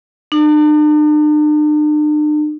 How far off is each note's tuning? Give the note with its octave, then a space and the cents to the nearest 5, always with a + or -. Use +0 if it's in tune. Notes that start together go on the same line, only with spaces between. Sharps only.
D4 +45